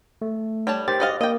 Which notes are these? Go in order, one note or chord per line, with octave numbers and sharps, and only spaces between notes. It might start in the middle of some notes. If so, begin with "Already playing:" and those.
A3
G3 C#5 A5
D#3 G4 C5 A6
F#4 D#5 F5
A#3 D#5 G5